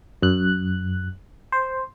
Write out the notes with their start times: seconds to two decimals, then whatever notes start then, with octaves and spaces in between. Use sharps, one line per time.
0.22 F#2 F#6
1.52 C5